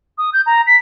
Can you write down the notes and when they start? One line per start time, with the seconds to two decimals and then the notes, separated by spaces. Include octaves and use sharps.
0.18 D#6
0.33 G6
0.46 A#5
0.67 B6